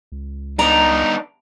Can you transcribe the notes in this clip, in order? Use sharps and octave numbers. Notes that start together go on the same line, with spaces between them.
C#2
B3 D4 D#4 A#5